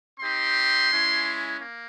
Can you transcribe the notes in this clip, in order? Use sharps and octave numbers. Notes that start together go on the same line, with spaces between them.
C4 D#4 G4 C6
G#3 C#4 E4
A#3